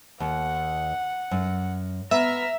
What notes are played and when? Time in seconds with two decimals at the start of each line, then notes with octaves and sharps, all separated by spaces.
0.20 D#2 F#5
1.31 F#2
2.11 B3 E5 A#5 F6